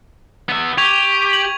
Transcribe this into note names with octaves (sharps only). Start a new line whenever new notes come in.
B3 E5
G4 C#6 G#6 F7
F#7